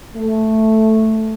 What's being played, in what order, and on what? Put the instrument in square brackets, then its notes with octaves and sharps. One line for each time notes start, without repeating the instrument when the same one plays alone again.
[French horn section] A3